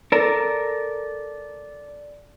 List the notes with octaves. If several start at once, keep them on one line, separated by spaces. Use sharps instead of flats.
A4 A#4 D5